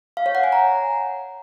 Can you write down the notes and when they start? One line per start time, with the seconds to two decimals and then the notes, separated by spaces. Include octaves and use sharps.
0.17 F5
0.26 C#5
0.35 F#5
0.44 G#5
0.52 A#5